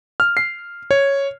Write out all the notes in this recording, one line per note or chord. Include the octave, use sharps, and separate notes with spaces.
F6
C7
C#5